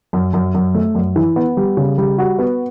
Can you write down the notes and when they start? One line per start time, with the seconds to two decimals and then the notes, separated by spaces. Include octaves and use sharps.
0.13 F#2
0.33 F#2
0.54 F#2
0.74 A3
0.95 F#2
1.16 E3
1.36 B3
1.57 G3
1.77 C#3
1.98 G3
2.18 F#4
2.39 B3